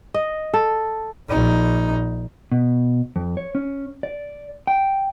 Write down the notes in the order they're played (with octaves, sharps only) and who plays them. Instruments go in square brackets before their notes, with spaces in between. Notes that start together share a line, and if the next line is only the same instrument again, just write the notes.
[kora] D#5
A4
[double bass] A#1 D#4
[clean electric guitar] B2
F2
C#5
C#4
D5
G5